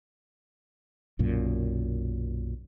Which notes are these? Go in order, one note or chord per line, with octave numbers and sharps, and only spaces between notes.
B1 F#2 A#2